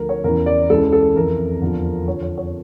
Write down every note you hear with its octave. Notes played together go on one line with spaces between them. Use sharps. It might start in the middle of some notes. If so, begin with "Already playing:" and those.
Already playing: D2 D3 F3 A#4
C#5
E2 C#3 E3 A#4
D5
C#2 C#3 E3 A4
A4
F2 E3 A#4
E2 D3 F3
F2 D3 F3 C#5
C#5
C#5